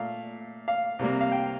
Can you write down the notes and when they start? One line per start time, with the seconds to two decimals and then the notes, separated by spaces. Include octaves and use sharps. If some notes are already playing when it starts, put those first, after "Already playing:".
Already playing: A#2 A3 F5
0.68 F5
0.99 C2 C3 G3 A#3
1.21 F5
1.32 G5